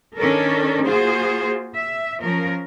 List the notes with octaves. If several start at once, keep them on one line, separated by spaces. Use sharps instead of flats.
D#3 C#4 D4 A4 A#4
A#3 F4 F#4 G#4 C5
E5
F3 C#4 A#4